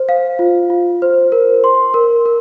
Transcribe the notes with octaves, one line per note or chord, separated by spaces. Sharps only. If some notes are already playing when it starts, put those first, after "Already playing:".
Already playing: C5
F5
F4
F4
C5
A#4
C6
A#4
A#4